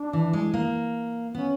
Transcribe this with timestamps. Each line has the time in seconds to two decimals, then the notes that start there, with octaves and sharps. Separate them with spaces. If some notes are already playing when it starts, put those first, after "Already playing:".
Already playing: D4
0.13 E3
0.33 G#3
0.54 A#3
1.34 B3 C#4